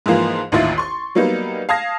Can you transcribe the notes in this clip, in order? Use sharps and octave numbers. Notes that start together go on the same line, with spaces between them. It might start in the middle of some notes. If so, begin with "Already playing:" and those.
G#2 E3 F3 A#3 F4
A1 D#2 D#3 E4 F4 A6
C6 C#6
F#3 G3 A#3 B3 D#4
F5 A5 D#6 G#6 A#6